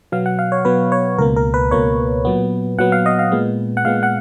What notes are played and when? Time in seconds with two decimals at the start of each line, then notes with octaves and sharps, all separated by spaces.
0.12 B2 F#3 B3 F5
0.26 F#5
0.39 F5
0.52 C#5
0.65 B2 F#3 B3 B4
0.92 C#5
1.18 C#2 B2 A#3 A#4
1.36 A#4
1.54 B4
1.71 C#2 B2 A#3 C#5
2.25 A#2 F#3 B3
2.79 A#2 F#3 B3 F#5
2.92 F5
3.06 D#5
3.19 F5
3.32 A#2 G#3 B3
3.77 F#5
3.85 A#2 G#3 B3 F5
4.03 F#5